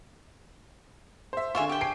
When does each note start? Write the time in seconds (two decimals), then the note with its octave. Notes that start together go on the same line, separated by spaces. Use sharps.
1.33 C5 E5
1.55 D3 F4 E5 G#5 C#6
1.69 G4 G5
1.81 G#5 C7 D7